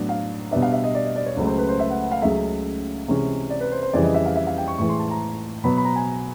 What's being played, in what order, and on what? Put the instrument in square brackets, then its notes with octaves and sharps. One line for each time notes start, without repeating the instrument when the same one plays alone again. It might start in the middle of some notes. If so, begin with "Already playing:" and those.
Already playing: [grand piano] A2 F#3 B3 D4
F5
B2 G3 B3 D4 E5
F5
E5
D#5
D5
D#5
D5
C#5
C#2 C#3 F#3 A3 C5
C5
B4
C5
E5
F#5
F#5
F5
C#2 C#3 F#3 A3 E5
C3 E3 G#3 C#4
D5
B4
C5
C5
F2 C#3 E3 G3 D5
D#5
E5
F5
E5
F5
G5
C#6
A2 E3 G#3 C#6
C6
A5
A#5
B2 F#3 B3 B5
B5
A#5
G#5